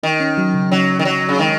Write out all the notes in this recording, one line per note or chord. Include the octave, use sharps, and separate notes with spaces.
D#3 D#4
C#4
F#3
C#3
F#3 C#4
D#3
F#3
C#3
D#3 G#3